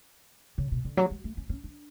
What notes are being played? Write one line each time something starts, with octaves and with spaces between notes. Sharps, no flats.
C#3
B2
D3
F#3
G#3
A3
C#4
C#4
D4